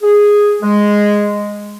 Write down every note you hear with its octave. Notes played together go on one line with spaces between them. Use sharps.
G#4
G#3